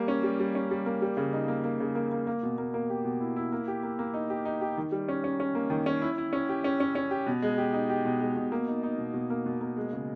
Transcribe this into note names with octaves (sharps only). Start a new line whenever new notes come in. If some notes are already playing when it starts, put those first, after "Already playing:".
Already playing: G3 A#3
C#4
G3
G3
C#4
G3
A#3
G3
C#3
D#4
A#3
A#3
C#3
A#3
A#3
A#3
B2
A#3
A#3
G4
B2
E4
E4
A#3
G4
A#3
A#3
D#4
G4
D#4
G4
D#3
G3
C#4
C#4
C#4
A#3
D#3
C#4
E4
E4
C#4
G4
C#4
C#4
C#4
G4
B2
G#3
G4
D#4
G4
B2
G#3
B2
A#3
D#4
D#4
B2
B2
A#3
B2
A#3
G#3
C#3